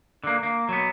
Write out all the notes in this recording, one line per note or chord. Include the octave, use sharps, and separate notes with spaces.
D3 A#3
A#3
F#3 B3